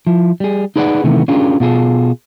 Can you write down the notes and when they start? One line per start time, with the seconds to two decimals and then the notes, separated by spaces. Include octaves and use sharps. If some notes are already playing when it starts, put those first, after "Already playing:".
0.07 F3 E4
0.40 G3 G#4
0.76 D#4 G#4 B4 D5 D#5 F#5
1.04 C3 D#3 E3 A3 B3
1.28 C#4 D4 F4 G4 G#4 A#4
1.60 B2 F4 G#4 A4